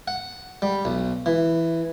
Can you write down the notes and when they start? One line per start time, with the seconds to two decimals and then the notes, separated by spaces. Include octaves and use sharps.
0.08 F#5
0.62 G3
0.85 B1
1.26 E3